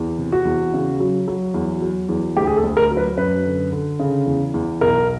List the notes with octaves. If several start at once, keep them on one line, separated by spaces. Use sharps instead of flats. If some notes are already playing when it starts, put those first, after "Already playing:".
Already playing: E2
C3
F#4
E2
C#3
F#3
F#3
E2
F#3
E2
D2 G4
G#4
A4
D2
A#4
F#3
B4
F#2 B4
D3
D3
C#3
E2
E2
B1 A#4